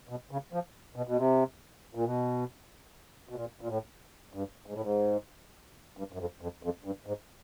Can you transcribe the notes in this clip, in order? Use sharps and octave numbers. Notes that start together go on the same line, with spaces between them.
B2
C#3
F3
B2
B2
C3
A#2
B2
B2
A#2
A#2
A2
G2
G#2
A2
G#2
G2
F#2
F2
F2
F2
G2
G#2